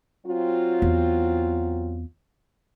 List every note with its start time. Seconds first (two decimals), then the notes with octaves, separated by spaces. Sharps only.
0.26 F#3 C4 F4
0.82 E2 E4